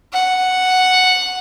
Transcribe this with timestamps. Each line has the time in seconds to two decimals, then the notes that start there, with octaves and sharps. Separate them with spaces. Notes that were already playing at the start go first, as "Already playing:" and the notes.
0.13 F#5